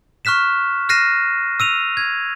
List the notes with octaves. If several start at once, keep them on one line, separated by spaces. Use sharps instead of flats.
C#6 F6 F#6 B6 E7
F6 F#6 A#6 C7 D#7 E7
E6 D#7 F7
G#6